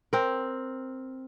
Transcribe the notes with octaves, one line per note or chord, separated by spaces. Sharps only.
C4 A#4